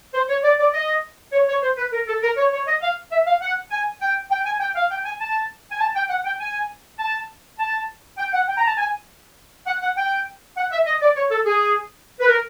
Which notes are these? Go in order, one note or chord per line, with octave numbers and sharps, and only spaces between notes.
C5
C#5
D5
D5
D#5
C#5
C#5
C5
B4
A#4
A4
A#4
C#5
C#5
D#5
F5
E5
F5
F#5
G#5
G5
G5
G#5
G5
F5
G5
G#5
A5
G#5
A5
G5
F#5
G5
G#5
A5
A5
G5
F#5
G5
A#5
A5
G#5
F#5
F#5
G5
F#5
E5
D#5
D5
C#5
A4
G#4
B4
A#4